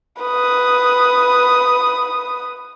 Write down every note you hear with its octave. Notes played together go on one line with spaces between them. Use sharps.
B4 D#6